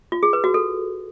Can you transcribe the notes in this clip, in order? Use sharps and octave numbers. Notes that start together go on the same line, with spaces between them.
F4
G#4
B4
F#4
A4